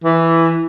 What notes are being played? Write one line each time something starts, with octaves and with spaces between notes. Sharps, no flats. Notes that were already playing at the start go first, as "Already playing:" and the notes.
E3